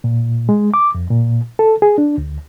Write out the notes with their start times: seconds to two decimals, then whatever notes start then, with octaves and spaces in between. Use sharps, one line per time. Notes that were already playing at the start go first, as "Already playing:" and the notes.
0.04 A#2
0.49 G#3
0.74 D6
0.95 F2
1.10 A#2
1.59 A4
1.82 G#4
1.98 D4
2.18 D2